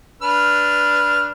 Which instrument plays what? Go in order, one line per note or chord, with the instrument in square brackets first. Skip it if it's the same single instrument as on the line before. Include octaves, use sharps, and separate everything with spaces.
[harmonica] D4 B4 F6